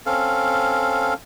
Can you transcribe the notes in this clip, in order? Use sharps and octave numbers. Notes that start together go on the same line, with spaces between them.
C4 C#4 A4 F5